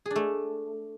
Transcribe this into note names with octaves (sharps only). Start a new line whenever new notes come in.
G#4
D4
A3